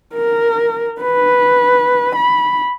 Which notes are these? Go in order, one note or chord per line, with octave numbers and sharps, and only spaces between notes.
A#4
B4
B5